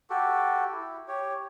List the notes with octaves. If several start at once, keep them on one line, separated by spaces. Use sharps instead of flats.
F#4 G4 A4
E4
G4 C#5